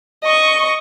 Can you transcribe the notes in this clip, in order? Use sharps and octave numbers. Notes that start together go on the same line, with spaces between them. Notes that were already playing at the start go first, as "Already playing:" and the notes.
D#5 C#6